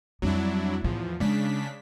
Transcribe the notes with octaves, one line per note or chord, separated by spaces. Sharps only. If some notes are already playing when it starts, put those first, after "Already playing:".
F2 F#3 G3 D4 E4
E2 A2 F3 F4
C#3 G#3 D4 B6